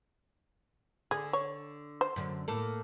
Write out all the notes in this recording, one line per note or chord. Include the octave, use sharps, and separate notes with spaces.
D3 G#4
C#5
C5
F#2 D3
A2 A#3 A4